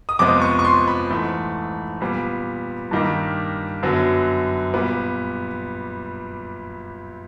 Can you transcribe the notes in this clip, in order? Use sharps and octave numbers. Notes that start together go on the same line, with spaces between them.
D#6
F2 C3 F3 G#3 B3 D6
C#6
C#6
C6
B5
G#2 E3 A3
A#2 G3 B3
G2 D#3 G3 A#3
F#2 D3 F#3 B3
A#2 G3 B3